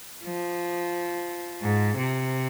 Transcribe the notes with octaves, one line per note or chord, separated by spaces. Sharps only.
F3
G#2
C3